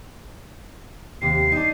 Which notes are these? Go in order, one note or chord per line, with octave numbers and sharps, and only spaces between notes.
D#2 C3 C7
D4 D#4